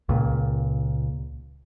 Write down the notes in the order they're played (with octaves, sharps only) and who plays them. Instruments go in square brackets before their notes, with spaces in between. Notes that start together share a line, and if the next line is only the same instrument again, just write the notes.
[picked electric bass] C#2 A#2